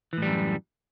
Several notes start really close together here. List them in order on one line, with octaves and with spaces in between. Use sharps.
E3 A2 G3 F#2